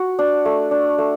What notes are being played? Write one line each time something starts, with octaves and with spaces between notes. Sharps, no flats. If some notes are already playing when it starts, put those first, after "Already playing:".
Already playing: F#4
D4
A3
D4
A3